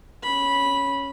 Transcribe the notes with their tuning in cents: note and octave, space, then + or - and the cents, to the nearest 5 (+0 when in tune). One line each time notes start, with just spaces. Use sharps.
C#4 +0 B5 -10